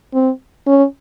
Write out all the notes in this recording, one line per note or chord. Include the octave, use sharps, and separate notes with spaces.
C4
C#4